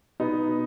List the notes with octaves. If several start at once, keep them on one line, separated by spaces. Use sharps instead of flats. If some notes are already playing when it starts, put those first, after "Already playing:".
B2 B3 D#4